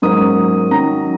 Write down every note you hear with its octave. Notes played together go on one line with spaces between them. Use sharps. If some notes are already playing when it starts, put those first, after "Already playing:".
G#2 F#3 A#3 C#4 D#6
D#3 F#3 C#4 A#5